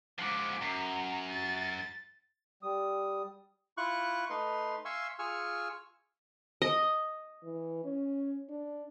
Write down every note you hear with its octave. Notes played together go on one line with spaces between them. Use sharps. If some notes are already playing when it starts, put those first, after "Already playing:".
G#2 F3 F#5 D6
F#2 A#5
A6
G3 D#6
E4 F4 C#6 F#6
A3 D#4 B4 C6
E5 F5 G#5 C6 C#6 E6
F4 G#4 G#5 C#6 E6 F6
D#5
E3
C#4
D4